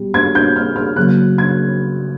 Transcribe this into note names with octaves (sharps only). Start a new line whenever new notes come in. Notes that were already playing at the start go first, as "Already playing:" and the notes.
Already playing: B2 G3
G#6
G6
F6
F6
C#3 F#3 A#3 F#6
G#6